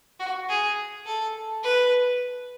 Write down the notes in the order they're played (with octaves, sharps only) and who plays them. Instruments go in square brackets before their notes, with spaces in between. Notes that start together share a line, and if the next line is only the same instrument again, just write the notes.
[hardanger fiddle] F#4
G#4
A4
B4